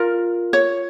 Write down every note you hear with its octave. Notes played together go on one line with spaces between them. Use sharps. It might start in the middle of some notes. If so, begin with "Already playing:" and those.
Already playing: F4 A#4
C#5